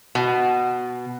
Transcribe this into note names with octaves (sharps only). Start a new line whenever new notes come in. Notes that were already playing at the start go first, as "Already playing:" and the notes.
B2